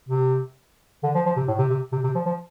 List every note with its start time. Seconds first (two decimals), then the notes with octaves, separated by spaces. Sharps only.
0.09 C3
1.03 D3
1.15 F3
1.26 F3
1.37 C3
1.48 A2
1.59 C3
1.70 C3
1.92 C3
2.04 C3
2.15 F3
2.26 F3